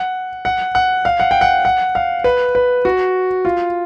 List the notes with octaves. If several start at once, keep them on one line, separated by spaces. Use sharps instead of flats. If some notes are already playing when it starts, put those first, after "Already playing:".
Already playing: F#5
F#5
F#5
F5
F#5
G5
F#5
F#5
F5
B4
B4
F#4
F4